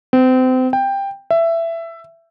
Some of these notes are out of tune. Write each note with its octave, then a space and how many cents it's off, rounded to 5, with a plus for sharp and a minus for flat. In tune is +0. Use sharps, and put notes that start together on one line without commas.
C4 -30
G5 +10
E5 +15